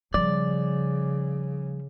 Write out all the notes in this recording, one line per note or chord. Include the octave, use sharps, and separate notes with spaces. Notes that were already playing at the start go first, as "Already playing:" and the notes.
C#3 F3 G3 D5